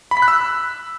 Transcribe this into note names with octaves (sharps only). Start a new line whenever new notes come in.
B5
B6
F#6
E6